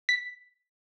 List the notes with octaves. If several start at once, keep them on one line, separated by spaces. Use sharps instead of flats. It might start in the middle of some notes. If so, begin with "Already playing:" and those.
B6